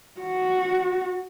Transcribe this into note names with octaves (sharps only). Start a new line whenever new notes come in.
F#4